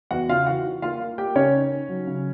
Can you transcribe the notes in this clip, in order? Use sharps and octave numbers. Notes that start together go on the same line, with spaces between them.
E2 F#4 F#5
C#3 F4 F5
E3 F#4 F#5
E3
A#3 F4 F5
A#3
A#3 G4 G5
C#3 C#4 C#5
D#4
D#4
F#3
C#3